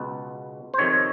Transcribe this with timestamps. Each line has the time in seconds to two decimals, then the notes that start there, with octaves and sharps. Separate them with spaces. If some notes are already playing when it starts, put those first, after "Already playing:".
Already playing: C#2 B2
0.74 C5
0.78 F2 C3 D#3 C#5